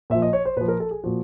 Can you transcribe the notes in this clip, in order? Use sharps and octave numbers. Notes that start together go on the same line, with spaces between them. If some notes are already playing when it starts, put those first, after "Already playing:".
A#2 F3 E5
D#5
C#5
C5
A#2 F3 B4
A#4
A4
G#4
A#2 F3 F#4